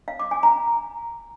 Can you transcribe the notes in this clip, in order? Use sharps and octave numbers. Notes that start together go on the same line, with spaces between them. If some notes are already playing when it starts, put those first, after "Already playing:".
F5
D6
G#5
A#5